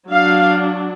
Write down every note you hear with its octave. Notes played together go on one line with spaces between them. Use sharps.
F#3 D4 F5